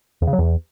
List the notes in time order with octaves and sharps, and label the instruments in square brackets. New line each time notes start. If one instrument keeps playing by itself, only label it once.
[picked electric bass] E2
C#3
F#3
E2